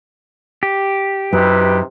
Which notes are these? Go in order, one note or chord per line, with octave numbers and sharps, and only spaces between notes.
G4
F#2 C3 D#4 E4 B4